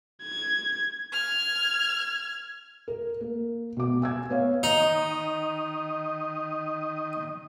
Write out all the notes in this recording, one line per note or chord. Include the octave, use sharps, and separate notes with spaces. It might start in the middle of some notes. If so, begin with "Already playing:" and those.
G#6
F6 G#6
A#4
A#3
B2 D6
G#5 E6 G#6
B3 C#5 F5
D#3 D#4 D#5